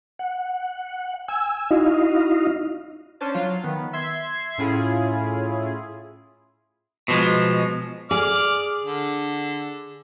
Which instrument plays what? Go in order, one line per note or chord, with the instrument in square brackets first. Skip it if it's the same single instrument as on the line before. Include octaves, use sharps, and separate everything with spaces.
[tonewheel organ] F#5
G#5 E6
D#4 E4 F#4 D#5 F5
[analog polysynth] C#4 D4 C5 A5
F#3 F4
D#3 B3
E5 C6 G#6 C7
A2 C#4 E4 F4 G#4
[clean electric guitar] B2 F3 G#3
[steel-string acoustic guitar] G#4 [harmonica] D5 D6 F6
[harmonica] D3